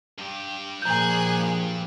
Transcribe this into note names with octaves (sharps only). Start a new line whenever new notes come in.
G2 G4
A#2 F3 G#4 A#5 F#6 G6